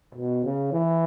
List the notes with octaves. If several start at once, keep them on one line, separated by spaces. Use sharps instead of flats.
B2
C#3
E3